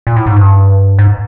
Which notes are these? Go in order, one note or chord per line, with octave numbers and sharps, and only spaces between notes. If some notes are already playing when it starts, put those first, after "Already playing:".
A#2
A2
G#2
G2
G#2